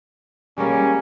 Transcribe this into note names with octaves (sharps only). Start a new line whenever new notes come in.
G3 G#3 A#3 C#4